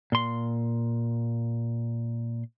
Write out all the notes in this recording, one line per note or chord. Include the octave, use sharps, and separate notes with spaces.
A#2 C6